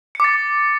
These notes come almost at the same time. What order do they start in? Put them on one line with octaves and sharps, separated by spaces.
C#7 D6 A6